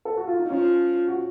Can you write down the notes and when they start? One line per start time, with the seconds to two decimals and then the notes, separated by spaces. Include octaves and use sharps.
0.05 A4
0.17 F#4
0.27 F4
0.39 D#4
0.50 F3 C#4
1.08 F#4